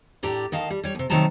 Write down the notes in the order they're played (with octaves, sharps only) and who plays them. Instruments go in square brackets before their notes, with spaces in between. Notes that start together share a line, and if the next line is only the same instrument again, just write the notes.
[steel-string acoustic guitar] A2 D4 G4 A#5
D#3 D#5 F5 A5
G3
G3 C#5
D#2 C3
C3 D#3 F#3 A3 A5 A#5